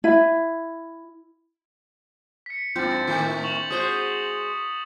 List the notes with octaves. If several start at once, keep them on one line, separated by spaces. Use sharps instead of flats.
E4
B6 C#7
G2 F3 C4 D4 G6 A6
A2 D#3 A3 E4 F4 C5
C#6 F7 F#7
G#3 F#4 C5 D#6